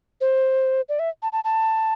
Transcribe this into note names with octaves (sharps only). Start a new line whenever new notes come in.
C5
D5
E5
A5
A5
A5